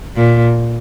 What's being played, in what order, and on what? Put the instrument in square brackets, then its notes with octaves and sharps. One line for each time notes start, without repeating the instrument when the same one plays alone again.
[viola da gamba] A#2